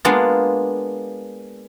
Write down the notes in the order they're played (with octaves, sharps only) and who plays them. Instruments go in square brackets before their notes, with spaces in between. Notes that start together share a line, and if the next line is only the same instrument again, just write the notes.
[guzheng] G#3 A#3 B3 D4 F4